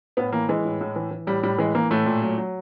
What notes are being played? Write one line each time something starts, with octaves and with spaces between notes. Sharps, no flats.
A2 B3
E3 A#3
E3 G#3
A2
A2
E3
E3
A2 G3
A2 G3
E3 G#3
E3 A#3
A2 A3
A#2
F#3
F#3